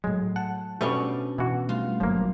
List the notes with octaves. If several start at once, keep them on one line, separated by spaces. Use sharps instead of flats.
A2 F#3 G#3
F#5 A5
B2 G3 A3 C#4 D4
B2 E3 F#4
G3 A3 F4
G1 F3 F#3 A#3